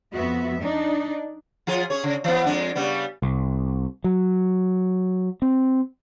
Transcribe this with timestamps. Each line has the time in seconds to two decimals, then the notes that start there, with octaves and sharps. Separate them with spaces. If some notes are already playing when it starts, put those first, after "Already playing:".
0.14 F2 B3 F#4 E5
0.60 D4 D#4
1.67 F3 F4 G#4
1.90 C#4 G#4 C#5
2.04 C#3
2.24 E3 B3
2.46 F2 G#3 D4
2.75 C#3 G3 B3
3.22 C2
4.04 F#3
5.42 C4